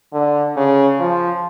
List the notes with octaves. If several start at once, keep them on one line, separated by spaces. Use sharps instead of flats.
D3
C#3
F3